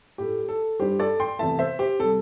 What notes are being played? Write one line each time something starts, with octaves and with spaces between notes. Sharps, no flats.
A2 A3 G4
A4
G2 G3 G4 C5
A4 D5
G5 C6
E2 C3 A3 E5 A5
C5 E5
G4 C5
C3 G3 A4